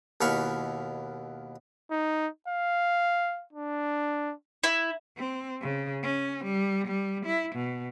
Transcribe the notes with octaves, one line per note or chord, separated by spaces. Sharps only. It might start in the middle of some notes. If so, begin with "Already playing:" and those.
D#2 B2 E4 F5 B5 C#6
D#4
F5
D4
E4
C4
C#3
C#4
G3
G3
E4
B2